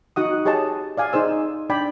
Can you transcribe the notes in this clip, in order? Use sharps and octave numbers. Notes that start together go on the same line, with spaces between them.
D#4 F#4 F#5 D#6
G4 G#4 C#5 D#5 A5
D5 F5 G#5
D#4 G#4 C5 E6
D4 D5 G5 B5